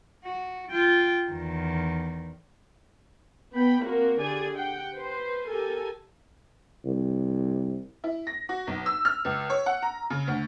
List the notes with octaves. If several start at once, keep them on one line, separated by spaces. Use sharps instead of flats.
F#4
F4 G5
E2 D#3
B3 G5 B5
A#3 C4 F#4 A#4
D3 G4 G#4 D5 G#5
G4 F#5 G5
B4 C5
G4 A4 A#4 G#5
C2
E4
A#6
F#4
B1
E6
F6
C#2
C#5
F#5
A#5
C#3
D2